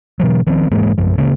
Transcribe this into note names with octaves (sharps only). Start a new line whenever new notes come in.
B2 E3 F#3
D#3 F3 C4
G#2 E3 G#3 A#3
A#1 F#2 F3
D1 C#3 G#3 A#3